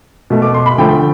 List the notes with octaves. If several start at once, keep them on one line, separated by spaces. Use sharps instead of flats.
B2 A3
D6
C6
B5
D3 F3 A3 G5